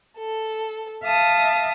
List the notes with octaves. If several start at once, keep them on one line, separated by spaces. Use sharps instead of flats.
A4
E5 F5 A5 D#6